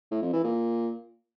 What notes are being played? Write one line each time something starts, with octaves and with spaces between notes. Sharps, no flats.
A2
F2
E3
A#2